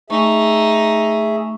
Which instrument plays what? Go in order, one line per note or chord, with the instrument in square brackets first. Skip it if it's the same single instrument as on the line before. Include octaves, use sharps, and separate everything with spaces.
[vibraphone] A3 C#6 [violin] D#4 [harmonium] G#4 E5